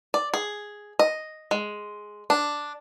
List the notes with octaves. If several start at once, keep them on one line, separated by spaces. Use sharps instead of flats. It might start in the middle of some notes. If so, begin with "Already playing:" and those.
D5
G#4
D#5
G#3
D4